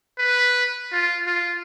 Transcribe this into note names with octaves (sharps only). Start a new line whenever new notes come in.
B4
F4
F4